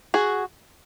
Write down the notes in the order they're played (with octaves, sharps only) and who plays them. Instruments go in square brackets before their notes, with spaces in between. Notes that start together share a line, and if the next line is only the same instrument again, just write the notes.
[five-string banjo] F#4 G#4